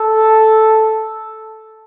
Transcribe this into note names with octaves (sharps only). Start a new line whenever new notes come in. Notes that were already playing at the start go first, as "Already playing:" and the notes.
Already playing: A4